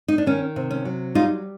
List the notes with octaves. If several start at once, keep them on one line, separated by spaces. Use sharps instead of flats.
D#4
D4
D#3 C#4
C3
C#4
F#3
G3 D#4 F4